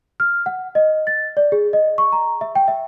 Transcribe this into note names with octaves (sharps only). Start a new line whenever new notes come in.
F6
F#5
D#5
A6
D5
G#4
D#5
C#6
A#5
E5
G5
E5